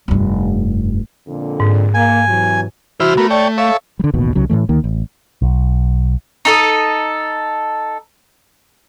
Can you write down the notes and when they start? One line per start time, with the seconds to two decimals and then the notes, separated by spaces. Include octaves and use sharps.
0.08 F1 G2
1.27 F2 A#2 D3
1.60 G#2
1.94 A#3 G#5
2.28 C3 E3 F#3
3.00 C2 E3 E4 F#4 C5 F6
3.17 A3 B3 A#4
3.30 C#5 D5 G5 A5
3.58 A4 C#5 E5 F5
3.99 D3 G3
4.14 D1 A1 D#2 B2
4.35 C2 C#3 F#3
4.50 A2 C3 E3 A3
4.69 D2 D#3 A#3
4.84 A1
5.42 B1
6.45 D#4 A4 D#6